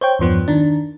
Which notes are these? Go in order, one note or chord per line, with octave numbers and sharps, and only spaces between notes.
C5 C#5 G5
E2 G2 F3 B3
D#3 D4